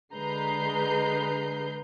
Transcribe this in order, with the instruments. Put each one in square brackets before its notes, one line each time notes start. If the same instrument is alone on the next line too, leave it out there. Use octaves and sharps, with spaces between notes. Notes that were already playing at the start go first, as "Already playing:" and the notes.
[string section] D3 G#3 B4 A#5 G6 C7